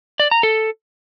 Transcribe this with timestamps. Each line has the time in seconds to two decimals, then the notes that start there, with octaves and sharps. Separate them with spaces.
0.20 D5
0.31 A#5
0.43 A4